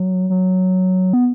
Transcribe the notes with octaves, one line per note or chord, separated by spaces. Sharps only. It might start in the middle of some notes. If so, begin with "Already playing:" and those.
Already playing: F#3
F#3
B3